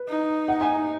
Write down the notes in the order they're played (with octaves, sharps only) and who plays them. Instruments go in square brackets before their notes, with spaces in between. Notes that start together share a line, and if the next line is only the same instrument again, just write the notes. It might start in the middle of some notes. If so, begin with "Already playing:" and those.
Already playing: [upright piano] B4
[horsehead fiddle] D#4
[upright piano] F#5
G#5